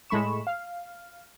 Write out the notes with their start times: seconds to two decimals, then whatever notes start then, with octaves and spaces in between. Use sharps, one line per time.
0.10 A2 G#3 A3 B5 C#6 E7
0.47 F5